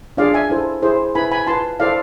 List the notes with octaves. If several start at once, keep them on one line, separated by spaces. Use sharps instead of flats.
D4 F4 G#4 D5 F5
E5 G#5
E4 A4 C5
E4 G#4 C5
E4 B4 G#5 B5
G#5 B5
F4 B4 A5 C6
E4 A4 C5 D5 F5